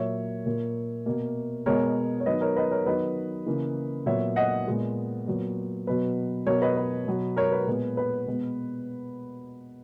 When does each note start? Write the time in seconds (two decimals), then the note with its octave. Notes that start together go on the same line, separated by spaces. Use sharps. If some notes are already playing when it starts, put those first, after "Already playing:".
Already playing: A#2 F#3 A#3 C#5 E5
0.46 A#2 A#3
1.06 B2 A#3
1.66 B2 G#3 B3 A#4 C#5
2.20 C#5
2.26 D#3 F#3 B3 B4 D#5
2.41 A#4 C#5
2.56 B4 D#5
2.71 A#4 C#5
2.86 D#3 F#3 B3 B4 D#5
3.46 C#3 E3 A#3
4.06 A#2 F#3 B3 C#5 E5
4.36 D#5 F#5
4.67 A#2 G#3 B3
5.27 A#2 F#3 B3
5.87 B2 F#3 B3 B4
6.47 B2 F#3 B3 A#4 C#5
6.62 B4 D#5
6.77 B4
7.07 B2 F#3 B3
7.37 A#4 C#5
7.52 B4
7.67 A#2 G#3 B3
7.97 B4
8.27 B2 G#3 B3